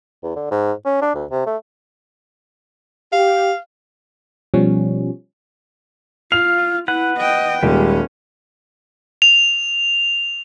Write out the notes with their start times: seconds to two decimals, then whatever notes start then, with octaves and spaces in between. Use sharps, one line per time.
0.23 E2
0.36 D3
0.51 G#2
0.85 C#4
1.02 D4
1.15 D2
1.31 C3
1.47 A3
3.13 G4 F5
4.54 B2 F3 G3 C#4
6.32 F4 F5 F7
6.88 E4 B4 F#5
7.18 D#5 G5
7.63 D#1 G3 G#3 C#4
9.22 F7